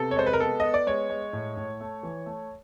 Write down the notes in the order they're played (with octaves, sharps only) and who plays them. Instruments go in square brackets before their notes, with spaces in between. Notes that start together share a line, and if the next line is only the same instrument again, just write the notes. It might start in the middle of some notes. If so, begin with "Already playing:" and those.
Already playing: [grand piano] C3 B3 A4
C#5
G#3 C5
B4
A#4
B3 A4
B3 D#5
D5
G#3 C#5
G#3
A2
A2
A3
E3
A3